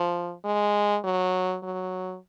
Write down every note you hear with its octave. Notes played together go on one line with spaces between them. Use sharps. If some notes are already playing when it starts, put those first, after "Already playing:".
Already playing: F3
G#3
F#3
F#3